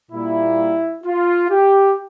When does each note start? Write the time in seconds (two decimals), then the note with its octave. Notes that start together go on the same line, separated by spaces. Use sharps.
0.11 A#2 G3 A#3 E4
1.04 F4
1.50 G4